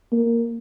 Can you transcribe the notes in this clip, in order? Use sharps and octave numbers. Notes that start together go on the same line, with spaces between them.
A#3